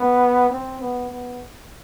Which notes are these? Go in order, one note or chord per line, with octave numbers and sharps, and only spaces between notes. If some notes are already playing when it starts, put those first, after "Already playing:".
Already playing: B3
C4
B3
B3